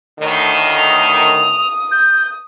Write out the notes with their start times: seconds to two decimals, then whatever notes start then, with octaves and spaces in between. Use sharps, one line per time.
0.20 D2 A2 D#3
0.78 D#6 F7
1.91 G6